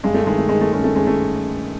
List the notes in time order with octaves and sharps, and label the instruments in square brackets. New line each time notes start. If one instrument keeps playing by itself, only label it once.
[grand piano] G2 [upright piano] G#3
[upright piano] A3
[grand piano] D#3 [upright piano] G#3
[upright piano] A3
[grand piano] D#3 [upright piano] G#3
[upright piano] A3
[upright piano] G#3 [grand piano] C#4
[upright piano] A3
[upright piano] G#3 [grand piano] C#4
[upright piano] A3